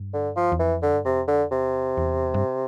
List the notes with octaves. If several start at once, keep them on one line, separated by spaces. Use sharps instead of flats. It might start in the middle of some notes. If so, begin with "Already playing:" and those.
Already playing: G2
D3
F3
E2
F2 E3
D3
G2
F2 C3
D3
E2 C3
E2
G2